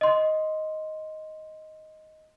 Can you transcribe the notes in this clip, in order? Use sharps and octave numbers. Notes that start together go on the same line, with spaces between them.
D#5 C6